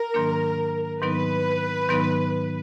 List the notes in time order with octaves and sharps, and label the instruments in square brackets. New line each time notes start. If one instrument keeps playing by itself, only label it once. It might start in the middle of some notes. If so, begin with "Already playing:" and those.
Already playing: [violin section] A#4
[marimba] G#2 D#3 F#3 A#3 D4
[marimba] G#2 D#3 F#3 B3 D#4 [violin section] B4
[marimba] G#2 D#3 F#3 B3 D#4